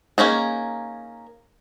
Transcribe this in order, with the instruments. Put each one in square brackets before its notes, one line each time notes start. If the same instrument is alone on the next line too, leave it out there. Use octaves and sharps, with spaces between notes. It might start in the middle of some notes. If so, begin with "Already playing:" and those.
[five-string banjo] A#3 C#4 D#4 G#4